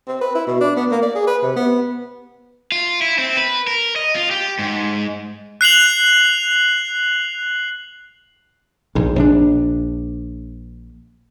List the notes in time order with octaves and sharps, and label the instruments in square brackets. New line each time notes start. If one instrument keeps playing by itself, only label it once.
[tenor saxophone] C4
B4
E4
B2
D4
B3
A#3
D5
G#4
B4
C3
B3
[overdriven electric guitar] F4
E4
C4
B4
A#4
D#5
F4
G4
G#2
[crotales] F#6 C7 F7 F#7
[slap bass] A#1 G#2
A#1 D4